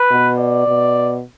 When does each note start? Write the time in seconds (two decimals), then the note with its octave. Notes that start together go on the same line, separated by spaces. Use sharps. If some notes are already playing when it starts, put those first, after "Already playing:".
Already playing: B4
0.11 B2
0.39 D5
0.68 B2